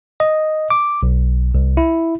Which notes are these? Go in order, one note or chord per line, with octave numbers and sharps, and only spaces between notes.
D#5
D6
B1
C2
E4